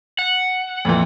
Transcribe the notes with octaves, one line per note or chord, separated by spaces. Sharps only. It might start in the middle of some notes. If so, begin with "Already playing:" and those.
F#5
F2 A#2 E3